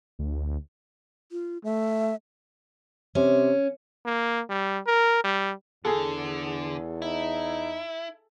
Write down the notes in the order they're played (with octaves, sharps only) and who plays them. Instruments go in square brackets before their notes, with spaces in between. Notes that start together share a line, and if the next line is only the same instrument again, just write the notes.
[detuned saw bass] D2
[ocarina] F4
[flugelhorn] A3 [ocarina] E5
[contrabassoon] C3 [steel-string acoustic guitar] C#4
[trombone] A#3
G3
A#4
G3
[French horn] E2 [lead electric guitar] D3 [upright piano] G#4 A4
[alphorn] D#4 [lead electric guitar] E4